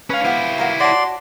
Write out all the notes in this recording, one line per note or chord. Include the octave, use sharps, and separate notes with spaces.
C#4 B4 F5
F3 B3 E4 G4
F#3 A#3 F#4
F#4 C#5 D5 A5 C6